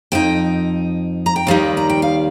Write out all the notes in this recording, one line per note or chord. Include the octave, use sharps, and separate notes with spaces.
F2 F3 D#4 G5
A#5
G5
D#2 D#3 G3 D#4 F5
A#5
G5
F5